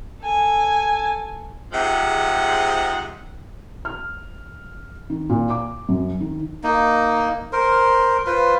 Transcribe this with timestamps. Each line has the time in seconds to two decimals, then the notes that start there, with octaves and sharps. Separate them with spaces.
0.21 A4 G#5
1.72 G#2 C3 F3 G#3 F#5
3.85 F6
5.10 D#3
5.30 A#2
5.50 D6
5.89 F#2
6.20 D#3
6.63 A#3 D#4
7.53 A#4 C5
8.26 F4 B4 C5